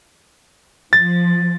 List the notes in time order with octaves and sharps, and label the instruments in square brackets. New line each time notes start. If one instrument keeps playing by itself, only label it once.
[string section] F3 [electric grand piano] A6